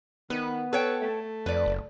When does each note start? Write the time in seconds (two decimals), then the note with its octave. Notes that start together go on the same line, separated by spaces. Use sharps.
0.30 D#3 B3 B4
0.73 A4 B4 C#5 G5
1.01 A3
1.46 F2 B4 D5
1.66 F#1